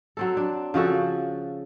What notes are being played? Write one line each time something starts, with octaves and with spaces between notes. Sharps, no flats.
F#3 C4 A4
D4
C#3 F3 F#4 A4